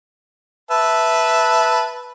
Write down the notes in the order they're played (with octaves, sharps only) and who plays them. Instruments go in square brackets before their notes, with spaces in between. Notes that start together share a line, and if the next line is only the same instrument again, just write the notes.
[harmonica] B4 E5 A5